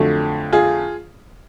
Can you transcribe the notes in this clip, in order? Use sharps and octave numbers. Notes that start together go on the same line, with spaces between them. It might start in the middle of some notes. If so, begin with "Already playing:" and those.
Already playing: F2 D3 F#3 A3
F4 G#4